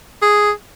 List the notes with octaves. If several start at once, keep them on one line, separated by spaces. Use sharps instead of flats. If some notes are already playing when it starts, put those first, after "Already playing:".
G#4